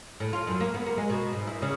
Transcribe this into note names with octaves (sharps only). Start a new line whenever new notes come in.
A2
F4
F#2
A#3
B3
A#3
G#3
B2
G#2
E4
C#3